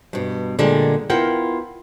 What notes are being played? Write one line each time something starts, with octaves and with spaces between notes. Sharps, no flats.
G2 B2
A#2 D3 G3 G#3
B3 E4 F4 A#4 F#5 G5